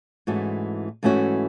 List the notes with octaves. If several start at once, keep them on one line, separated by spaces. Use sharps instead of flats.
G#2 E3 A3 C#4 F#4
G#2 E3 A3 C#4 F#4